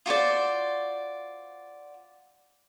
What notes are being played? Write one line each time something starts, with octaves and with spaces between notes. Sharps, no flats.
F4 F#4 C5 D5